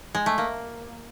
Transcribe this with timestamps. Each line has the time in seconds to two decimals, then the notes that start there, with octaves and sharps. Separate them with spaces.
0.15 G#3
0.26 A3
0.38 A#3